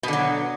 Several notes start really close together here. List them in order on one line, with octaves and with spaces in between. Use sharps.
B2 D3 F#3